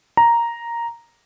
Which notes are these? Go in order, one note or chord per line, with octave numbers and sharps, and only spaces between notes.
A#5